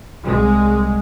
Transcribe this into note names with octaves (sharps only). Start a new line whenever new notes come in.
C2 G#3